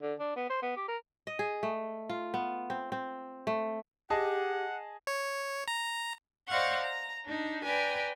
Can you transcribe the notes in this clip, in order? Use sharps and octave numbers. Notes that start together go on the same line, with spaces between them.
D3
D4
B3
C5
B3
G4
A#4
D#5
G#4
A3
F4
B3
C4
C4
A3
G4 G#4 D#5 F#5 A5
C#5
A#5
C5 D5 D#5 F5 F#5 C#6
A#5
D4 D#4
B4 D5 G5 G#5 A#5